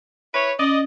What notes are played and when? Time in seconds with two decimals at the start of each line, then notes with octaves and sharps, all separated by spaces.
0.34 E4 B4 C#5
0.59 C#4 D5 D#5